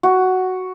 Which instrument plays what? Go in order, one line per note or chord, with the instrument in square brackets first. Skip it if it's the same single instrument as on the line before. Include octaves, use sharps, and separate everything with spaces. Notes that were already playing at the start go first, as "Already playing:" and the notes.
[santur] F#4